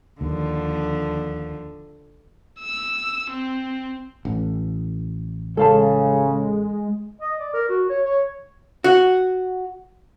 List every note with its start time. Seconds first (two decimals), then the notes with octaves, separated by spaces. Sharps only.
0.21 D#2 D3 F3
2.61 E6
3.31 C4
4.25 A1
5.57 C#3 G#3 A4 F5 A5
7.21 D#5
7.39 D5
7.54 A#4
7.69 F#4
7.89 C#5
8.05 C#5
8.84 F#4